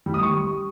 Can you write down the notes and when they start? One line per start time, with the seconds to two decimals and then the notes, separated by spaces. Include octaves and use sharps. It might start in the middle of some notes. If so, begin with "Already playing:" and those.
0.06 G3
0.14 D#6
0.21 G3 C#6